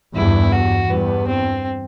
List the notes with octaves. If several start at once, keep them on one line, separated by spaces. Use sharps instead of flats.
E2 G2 E4
F#4
E2 G2 B3
C4